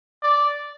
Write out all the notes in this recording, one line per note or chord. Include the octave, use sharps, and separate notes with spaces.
D5